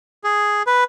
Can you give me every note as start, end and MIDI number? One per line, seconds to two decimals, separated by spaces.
0.24 0.63 68
0.67 0.84 71